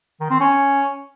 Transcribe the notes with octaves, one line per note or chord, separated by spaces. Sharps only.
D#3
C4
C#4